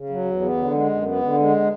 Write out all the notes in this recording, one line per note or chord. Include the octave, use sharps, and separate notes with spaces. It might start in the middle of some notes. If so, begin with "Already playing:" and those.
Already playing: C#3
F#3
E2
B3
D3
G#3
F#2
B3
D3
G#3